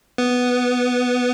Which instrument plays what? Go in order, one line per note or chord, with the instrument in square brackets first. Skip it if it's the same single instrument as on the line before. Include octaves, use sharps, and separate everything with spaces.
[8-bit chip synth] B3